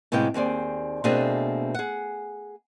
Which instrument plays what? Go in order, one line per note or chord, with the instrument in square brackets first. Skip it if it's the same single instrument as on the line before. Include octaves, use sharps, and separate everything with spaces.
[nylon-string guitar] A2 C3 G#3 B3 F5 G5
D#2 C4 G#4 D5
B2 A3 A#3 C4 D4 G#4
G#4 F#5